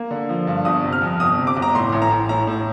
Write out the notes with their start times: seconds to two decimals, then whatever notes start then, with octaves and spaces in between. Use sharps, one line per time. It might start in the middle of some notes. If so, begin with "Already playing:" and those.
Already playing: A#3
0.11 D3
0.29 F3
0.47 G2
0.65 G1 D#6
0.84 C3
0.93 F6
1.01 F2
1.20 G1 D#6
1.39 C3
1.47 D6
1.56 G1
1.62 A#5
1.75 A2 C6
1.92 A1
2.02 A#5
2.11 A1
2.29 A2 A#5
2.47 A2